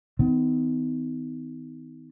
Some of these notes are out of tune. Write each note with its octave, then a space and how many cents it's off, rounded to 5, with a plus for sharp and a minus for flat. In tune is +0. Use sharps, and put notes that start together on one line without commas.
D#3 +25 B3 +45